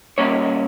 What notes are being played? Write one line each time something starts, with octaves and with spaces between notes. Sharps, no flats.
A#2 G3 A#3 C#4 C#5